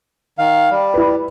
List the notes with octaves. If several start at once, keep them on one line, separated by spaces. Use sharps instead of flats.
D#3 F5
G3
E4 B4